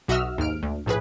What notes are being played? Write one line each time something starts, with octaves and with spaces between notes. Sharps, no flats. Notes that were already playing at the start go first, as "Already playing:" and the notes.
B1 F#4 D#5 E5 E6 F6
D#2 G#2 F6 D7
D2
A#1 A2 G#4 B4